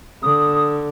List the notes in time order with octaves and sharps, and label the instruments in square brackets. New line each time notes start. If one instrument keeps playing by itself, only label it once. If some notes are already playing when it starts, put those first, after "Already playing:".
[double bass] D3 [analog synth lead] D#6